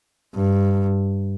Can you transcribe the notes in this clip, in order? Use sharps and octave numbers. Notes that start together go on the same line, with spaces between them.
G2